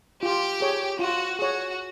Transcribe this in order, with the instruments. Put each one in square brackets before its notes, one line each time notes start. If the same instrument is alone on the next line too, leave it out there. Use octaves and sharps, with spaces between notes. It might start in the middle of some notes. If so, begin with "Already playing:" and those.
[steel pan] F4 [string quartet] G4
[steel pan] G#4 C#5
[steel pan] F4 [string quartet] F#4
[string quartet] F#4 [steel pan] G#4 C#5